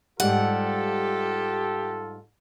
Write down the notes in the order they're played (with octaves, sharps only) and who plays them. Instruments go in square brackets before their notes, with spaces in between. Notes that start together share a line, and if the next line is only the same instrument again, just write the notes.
[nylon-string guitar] G#2 G3 [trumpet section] F4 A4 [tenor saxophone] G4 [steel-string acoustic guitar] F#5